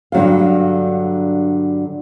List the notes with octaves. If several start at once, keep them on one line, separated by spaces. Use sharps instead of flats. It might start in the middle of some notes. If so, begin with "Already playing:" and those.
G2 D3 F#3 C4 F5